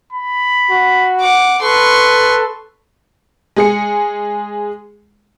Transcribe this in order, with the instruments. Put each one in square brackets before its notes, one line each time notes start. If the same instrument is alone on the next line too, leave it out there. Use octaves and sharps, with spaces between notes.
[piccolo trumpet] B5
[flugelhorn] F#4
[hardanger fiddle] F#5 D6
[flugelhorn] A4 [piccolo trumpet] B4 [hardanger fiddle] C6 C#6
[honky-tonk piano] G#3 G#4 C#7